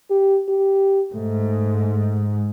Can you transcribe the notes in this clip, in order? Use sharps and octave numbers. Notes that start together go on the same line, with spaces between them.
G4
G4
G#2 A3